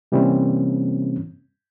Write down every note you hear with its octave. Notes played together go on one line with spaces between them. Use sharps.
C3 E3 G3 A#3 C4 C#4